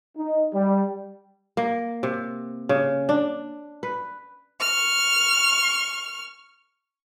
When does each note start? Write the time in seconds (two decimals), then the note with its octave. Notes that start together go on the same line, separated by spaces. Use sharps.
0.18 D#4
0.54 G3
1.57 A#3
2.03 C3
2.69 C#3
3.09 D4
3.83 B4
4.60 C#6 F6